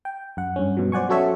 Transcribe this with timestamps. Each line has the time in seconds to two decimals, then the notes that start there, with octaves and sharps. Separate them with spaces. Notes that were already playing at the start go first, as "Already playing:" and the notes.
0.05 G5
0.37 F#2 F#5
0.56 G2 C#4
0.77 G2 B2 F3 F#3
0.92 C5 D5 F#5 G#5 C#6
1.09 F#3 C#4 F#4 A4 C#5 E5